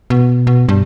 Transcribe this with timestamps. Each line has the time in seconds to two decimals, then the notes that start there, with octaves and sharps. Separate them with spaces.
0.10 B2
0.47 B2
0.69 G2